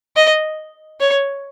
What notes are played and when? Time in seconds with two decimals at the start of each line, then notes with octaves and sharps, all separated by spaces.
0.16 D#5
1.00 C#5